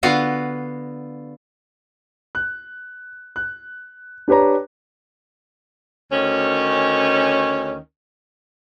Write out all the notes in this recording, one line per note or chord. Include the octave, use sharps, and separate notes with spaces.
D3 B3 F4 F#4 F5
F#6
F#6
D4 G4 B4 C#5 A#5
D2 D#3 C#4